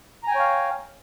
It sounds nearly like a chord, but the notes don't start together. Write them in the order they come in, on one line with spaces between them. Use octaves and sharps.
A#5 G#5 G5 C#5 F5